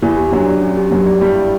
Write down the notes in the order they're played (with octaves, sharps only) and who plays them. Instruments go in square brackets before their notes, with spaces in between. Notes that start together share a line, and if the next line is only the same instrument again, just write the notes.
[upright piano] E2 E3 [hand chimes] G4
[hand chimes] G4
[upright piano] F#2 F#3 [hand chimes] D4
[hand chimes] D5
C#4
G4
[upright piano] F#2 F#3 [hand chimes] G4
[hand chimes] D5
[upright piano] G2 G3 [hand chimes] E4
[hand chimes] E4